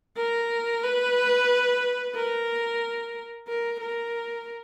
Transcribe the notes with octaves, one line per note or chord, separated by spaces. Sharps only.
A#4
B4
A#4
A#4
A#4